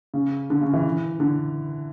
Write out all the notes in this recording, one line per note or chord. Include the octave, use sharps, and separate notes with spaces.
C#3
D3
C#3
E3
D3